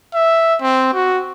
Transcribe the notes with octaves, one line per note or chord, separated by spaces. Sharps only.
E5
C4
F#4